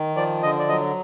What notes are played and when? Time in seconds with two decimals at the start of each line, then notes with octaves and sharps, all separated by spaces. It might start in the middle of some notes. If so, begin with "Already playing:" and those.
Already playing: D#3
0.16 F3 D5
0.43 D3 D#5
0.59 D5
0.69 F#3 D#5